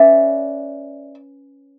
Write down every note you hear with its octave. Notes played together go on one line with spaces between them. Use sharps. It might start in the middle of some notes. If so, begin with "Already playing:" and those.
Already playing: C#4 B4 D5 E5